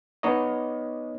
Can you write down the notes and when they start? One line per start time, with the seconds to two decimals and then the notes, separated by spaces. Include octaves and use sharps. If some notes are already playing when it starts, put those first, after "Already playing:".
0.23 B3 D#4 C#5 D#5